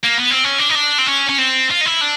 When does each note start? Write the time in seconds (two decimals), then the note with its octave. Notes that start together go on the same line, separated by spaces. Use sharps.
0.04 A#3
0.18 B3
0.31 C4
0.45 C#4
0.59 D4
0.70 D#4
0.75 D4
0.98 C4
1.06 C#4
1.29 C#4
1.38 C4
1.71 F4
1.81 D#4
1.86 E4
2.01 D4